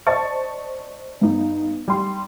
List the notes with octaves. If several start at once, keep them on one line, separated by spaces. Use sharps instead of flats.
C5 D5 D#5 A5 C#6 A6
G2 B3 D#4
G3 C6